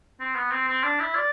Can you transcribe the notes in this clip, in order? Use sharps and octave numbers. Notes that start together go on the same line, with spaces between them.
C4
B3
C4
C4
D4
E4
D5